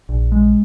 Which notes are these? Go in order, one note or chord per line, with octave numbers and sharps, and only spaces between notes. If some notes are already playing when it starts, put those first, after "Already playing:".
A#1
G#3